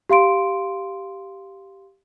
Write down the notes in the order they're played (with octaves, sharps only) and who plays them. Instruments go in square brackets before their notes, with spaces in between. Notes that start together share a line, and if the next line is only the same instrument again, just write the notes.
[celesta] G4 F5 C6 D7